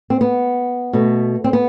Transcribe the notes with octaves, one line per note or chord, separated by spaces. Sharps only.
C4
B3
B2 A3
C4
B3